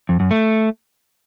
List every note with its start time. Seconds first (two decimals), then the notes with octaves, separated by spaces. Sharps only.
0.09 F2
0.20 F#2
0.31 A3